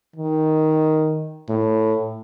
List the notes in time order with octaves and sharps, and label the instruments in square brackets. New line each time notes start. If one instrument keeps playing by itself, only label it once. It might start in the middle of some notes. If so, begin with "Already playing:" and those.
[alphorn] D#3
A2